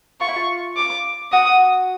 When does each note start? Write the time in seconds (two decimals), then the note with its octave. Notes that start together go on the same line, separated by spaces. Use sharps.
0.21 F4 C#6
0.28 E4
0.36 F4
0.77 D6
1.33 F#4 D#6